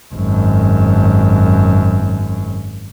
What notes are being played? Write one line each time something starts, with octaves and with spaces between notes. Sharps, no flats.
G#1 F#2